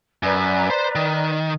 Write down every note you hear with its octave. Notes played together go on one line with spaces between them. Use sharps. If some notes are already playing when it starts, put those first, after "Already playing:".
F#2 B4 D5 A#5
C5 C6
D#3